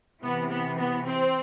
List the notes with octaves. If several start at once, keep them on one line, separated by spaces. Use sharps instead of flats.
C3 E3 B3
B3
B3
C4